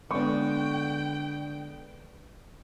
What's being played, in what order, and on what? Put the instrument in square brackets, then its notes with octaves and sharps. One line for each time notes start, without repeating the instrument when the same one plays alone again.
[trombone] D3 [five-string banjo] G#3 D4 [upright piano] B3 C#6 [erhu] G5